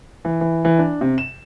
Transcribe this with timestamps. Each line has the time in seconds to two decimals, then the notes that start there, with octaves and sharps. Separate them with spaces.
0.25 E3
0.41 E3
0.65 E3
0.79 D4
1.01 C3
1.18 E7